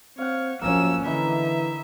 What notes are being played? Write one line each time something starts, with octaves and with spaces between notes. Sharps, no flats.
C4 C#5 F5 F#5
F#2 F3 A#3 C#4 E6
D3 E3 D#4 E4 E5